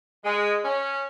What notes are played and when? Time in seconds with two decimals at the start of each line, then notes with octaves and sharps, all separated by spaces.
0.23 G#3
0.63 C#4